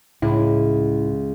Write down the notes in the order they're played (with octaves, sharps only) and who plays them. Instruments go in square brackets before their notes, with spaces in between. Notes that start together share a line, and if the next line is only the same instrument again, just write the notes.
[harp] C#2 [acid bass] A2 [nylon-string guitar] E4